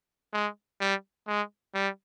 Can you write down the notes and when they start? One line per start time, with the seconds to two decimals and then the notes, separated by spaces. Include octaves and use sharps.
0.33 G#3
0.81 G3
1.28 G#3
1.74 G3